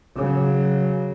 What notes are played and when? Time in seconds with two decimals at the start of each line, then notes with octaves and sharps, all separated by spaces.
0.17 C#3 F#3